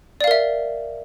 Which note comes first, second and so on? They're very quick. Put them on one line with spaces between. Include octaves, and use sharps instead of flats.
D5 F5 A#4 E5